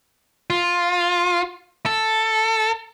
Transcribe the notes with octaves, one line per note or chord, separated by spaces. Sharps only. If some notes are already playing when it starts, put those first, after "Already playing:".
F4
A4